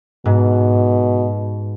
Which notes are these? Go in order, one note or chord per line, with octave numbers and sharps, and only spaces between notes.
G#2 B2